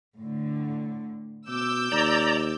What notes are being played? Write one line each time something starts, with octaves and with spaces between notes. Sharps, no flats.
A2 D3
B2 D6 E6 G6
D#2 D5 A#5